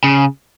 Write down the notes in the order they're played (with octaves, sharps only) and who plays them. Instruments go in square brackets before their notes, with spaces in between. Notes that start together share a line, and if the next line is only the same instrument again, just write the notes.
[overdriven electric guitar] C#3